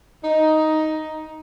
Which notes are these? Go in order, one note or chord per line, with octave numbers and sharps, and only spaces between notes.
D#4